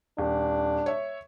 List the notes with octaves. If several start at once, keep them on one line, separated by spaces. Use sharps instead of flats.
D#1 D4
C#5 E5